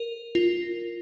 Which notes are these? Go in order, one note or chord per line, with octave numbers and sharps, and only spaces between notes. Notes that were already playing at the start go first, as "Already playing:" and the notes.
Already playing: A#4
F4